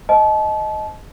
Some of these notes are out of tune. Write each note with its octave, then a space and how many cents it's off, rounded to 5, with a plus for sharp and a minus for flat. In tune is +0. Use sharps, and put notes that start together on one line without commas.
C5 +0 D#5 +5 A5 -30